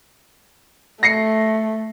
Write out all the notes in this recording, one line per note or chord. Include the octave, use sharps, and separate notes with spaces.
A3 A#6 C7 C#7